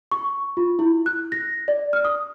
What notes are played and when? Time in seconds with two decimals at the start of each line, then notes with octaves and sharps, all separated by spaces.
0.11 C#6
0.57 F4
0.79 E4
1.06 F#6
1.32 A#6
1.68 D5
1.93 F6
2.05 D#6